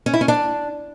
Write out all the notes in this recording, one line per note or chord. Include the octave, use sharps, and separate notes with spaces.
C#4
E4
C#4
D4